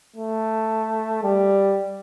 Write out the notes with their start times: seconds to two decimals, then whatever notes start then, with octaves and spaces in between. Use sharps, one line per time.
0.16 A3
1.23 G3